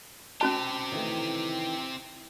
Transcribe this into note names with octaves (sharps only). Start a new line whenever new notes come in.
C4 C#4 F#4 G4 A5
D#3 E3 A3